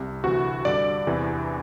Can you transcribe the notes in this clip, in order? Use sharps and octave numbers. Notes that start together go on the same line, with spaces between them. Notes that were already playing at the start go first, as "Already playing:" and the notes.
Already playing: C2 C3
D2 C3 E3 F#4
G2 D3 D5
E2 C3 E3